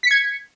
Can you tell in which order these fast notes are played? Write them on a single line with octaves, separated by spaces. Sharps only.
B6 C#7 G#6